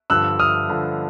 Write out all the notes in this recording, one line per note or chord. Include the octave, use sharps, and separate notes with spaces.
G2 D3 F3 E6 F#6
D#6 F6
G2 D3 F3